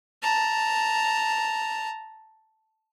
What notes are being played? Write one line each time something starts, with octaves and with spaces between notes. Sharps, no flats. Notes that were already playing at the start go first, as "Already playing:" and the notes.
A5 A#5